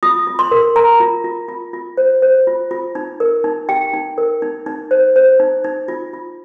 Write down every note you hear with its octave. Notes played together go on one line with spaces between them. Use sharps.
F4 D#6
F4
C6
A#4
A#4 A#5
F4
F4
F4
F4
C5
C5
F4
F4
D#4
A#4
D#4
G4 G5
D#4
A#4
D#4
D#4
C5
C5
D#4
D#4
F4
F4